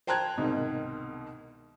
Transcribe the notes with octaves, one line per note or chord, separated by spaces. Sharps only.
C5 G5 A5 A#5 F#6 G#6
C2 G#2 B2 D#3